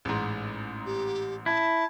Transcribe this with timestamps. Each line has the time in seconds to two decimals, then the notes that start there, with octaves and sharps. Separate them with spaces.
0.05 A1 G#2
0.86 G4
1.46 E4 A5